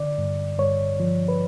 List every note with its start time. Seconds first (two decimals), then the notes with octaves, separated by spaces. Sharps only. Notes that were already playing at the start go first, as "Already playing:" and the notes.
Already playing: D3 D5
0.18 G2
0.58 G2 C#5
1.00 F3
1.28 B4